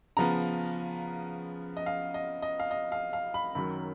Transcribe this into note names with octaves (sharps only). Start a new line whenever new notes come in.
C#3 F3 B3 A#5
D#5
F5
D#5
D#5
F5
D#5
F5
F5
B5
F#2 D#3 F#3 B5